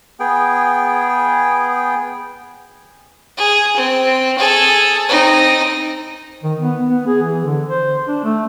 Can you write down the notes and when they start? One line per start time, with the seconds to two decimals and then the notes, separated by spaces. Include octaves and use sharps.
0.20 B3 G#4 G5
3.38 G#4
3.76 C4
4.38 G#4 A4
5.09 C4 D#4
6.44 D#3
6.61 B3
6.89 B3
7.07 G#4
7.22 E3
7.44 D3
7.67 C5
8.07 D4
8.24 A3